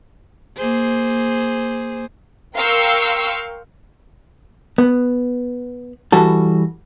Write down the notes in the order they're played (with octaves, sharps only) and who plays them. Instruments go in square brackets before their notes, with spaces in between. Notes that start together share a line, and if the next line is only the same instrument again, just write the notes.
[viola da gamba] A#3 G#4 C5
[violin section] A#4 F5 G5 C6 C#6 E6
[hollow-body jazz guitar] B3
E3 G3 F#4 A4